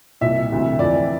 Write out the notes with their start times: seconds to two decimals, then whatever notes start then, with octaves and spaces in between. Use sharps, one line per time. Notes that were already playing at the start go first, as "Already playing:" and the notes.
0.21 C2 A#2 E5
0.50 D2 C3 E3
0.79 F2 E3 D5